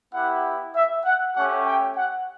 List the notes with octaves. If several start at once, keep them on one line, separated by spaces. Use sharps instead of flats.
B3 E4 G4 F#5
E5
F#5
A3 C#4 G4 F#5
G5
F#5